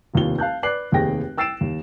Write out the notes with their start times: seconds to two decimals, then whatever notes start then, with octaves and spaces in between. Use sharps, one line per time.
0.14 F1 D#2 F4 G7
0.39 F5 A5 F#6 G6
0.63 B4 D5 D6 F#6 C7 F#7
0.92 F1 D#2 C3 G#4 G5 A#6
1.37 G5 E6 A6 C7 D7 E7
1.61 D#2